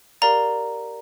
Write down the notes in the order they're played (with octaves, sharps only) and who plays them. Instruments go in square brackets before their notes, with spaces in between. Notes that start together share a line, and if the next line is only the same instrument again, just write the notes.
[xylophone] G4 A#4 D5 F5 A#5